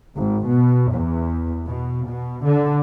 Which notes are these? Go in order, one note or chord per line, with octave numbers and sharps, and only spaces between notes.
G#1
B2
E2
B2
B2
D3